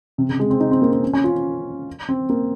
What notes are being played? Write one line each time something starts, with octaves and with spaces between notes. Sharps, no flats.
C3
C#3
G#3
C4
D#4
C4
A#3
C4
C#4
C#4
F4
C4
A#3